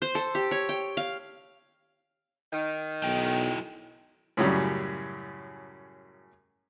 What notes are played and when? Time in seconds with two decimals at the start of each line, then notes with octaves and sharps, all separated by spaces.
0.02 C5
0.15 A4
0.35 G4
0.51 C#5
0.69 G5
0.97 F5
2.53 D#3
3.04 B1 F#3 E4 G5
4.37 F#2 A2 C#3 F#3 G3